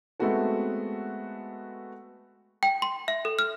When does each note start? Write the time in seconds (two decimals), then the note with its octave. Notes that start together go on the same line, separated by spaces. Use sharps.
0.20 G#3 A3 B3 C4 F#4 A4
2.63 G5
2.82 C6
3.08 E5
3.25 A4
3.39 F6